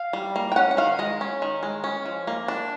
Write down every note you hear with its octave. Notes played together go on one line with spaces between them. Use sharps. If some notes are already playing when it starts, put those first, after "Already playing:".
Already playing: F5
G3
A#3
G5
C#4 F#5
F#5
D#3 F5
G#3 D#5
C#4
D#3
G#3
C#4
F3
A#3
D4